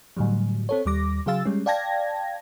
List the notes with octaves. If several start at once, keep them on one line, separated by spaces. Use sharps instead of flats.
A2 D3 F#3 G3
C4 A4 C#5
D#2 G3 D6 A#6
C#3 F#3 G#4 F5 E6 A6
G3 G#3 C#4
D5 F5 G5 A5 G#6 A#6